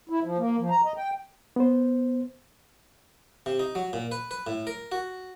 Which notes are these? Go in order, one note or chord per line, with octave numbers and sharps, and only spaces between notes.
E4
F3
A#3
F3
A#5
D#5
G5
B3 C5
C3
D#4
F#3
A#2
B4
B4
A2
A#4
F#4